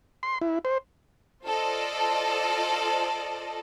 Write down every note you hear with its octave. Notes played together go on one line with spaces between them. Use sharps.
C6
E4
C5
F4 A4 C5 D5 D#5